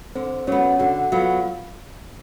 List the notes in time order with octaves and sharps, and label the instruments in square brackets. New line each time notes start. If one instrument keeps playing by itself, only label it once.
[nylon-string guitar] D3 [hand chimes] C4 C5
[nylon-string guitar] F#3 B3 [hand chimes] C#4 C#5
[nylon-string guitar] D3 [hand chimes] F#4 F#5
[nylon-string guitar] F#3 B3 [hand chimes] F4 F5